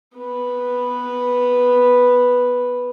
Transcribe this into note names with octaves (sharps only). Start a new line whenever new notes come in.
B3 B4